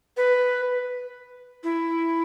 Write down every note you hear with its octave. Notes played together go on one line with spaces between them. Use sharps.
B4
E4